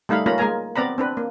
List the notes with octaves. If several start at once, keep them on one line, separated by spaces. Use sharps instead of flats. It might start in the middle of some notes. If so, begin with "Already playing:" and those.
G3 A3 D#4 F5 B5
A#3 C#4 F4 A#5 B5
G#3 A#3 A#4 G#5 A#5
B3 C4 D5 A#5 B5
C4 D4 B4
A#3